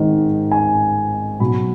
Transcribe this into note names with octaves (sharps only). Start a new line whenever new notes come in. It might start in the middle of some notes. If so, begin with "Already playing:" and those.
Already playing: G#1 G#2 D#3 G#3
G#5
B1 B2 F#3 B5